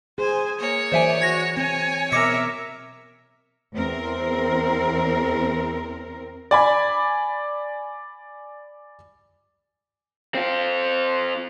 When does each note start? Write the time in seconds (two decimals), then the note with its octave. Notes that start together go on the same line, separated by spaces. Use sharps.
0.18 G#4 C5 G#5
0.59 A#3 C#5
0.92 E3 F#3 A#4 C5 D5 E5 G#5
1.22 F#4 G#6 A#6
1.57 C4 C#5 G#5
2.12 B2 A#4 E5 D6 A#6 C#7
3.73 E2 C4 A#4
6.51 D5 G#5 B5
10.35 C4 F4